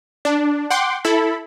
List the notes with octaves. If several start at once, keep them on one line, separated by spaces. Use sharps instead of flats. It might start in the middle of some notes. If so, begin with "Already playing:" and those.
D4
F#5 G5 C6 D6
E4 A4 B5